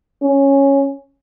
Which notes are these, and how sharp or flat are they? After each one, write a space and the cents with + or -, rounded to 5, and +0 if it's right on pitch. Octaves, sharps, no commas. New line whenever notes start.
C#4 -5